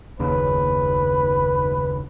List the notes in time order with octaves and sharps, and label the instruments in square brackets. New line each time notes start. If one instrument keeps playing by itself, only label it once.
[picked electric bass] F#1 D#2 C#3 [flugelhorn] B4